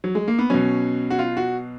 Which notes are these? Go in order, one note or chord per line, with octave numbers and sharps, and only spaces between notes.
F#3
G#3
A#3
B3
B2 F#3 C#4
F#4
F4
F#4